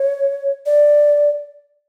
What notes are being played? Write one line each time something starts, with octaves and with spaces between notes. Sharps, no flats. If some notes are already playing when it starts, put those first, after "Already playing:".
Already playing: C#5
D5